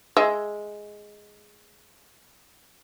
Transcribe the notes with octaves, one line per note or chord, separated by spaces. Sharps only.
G#3 E5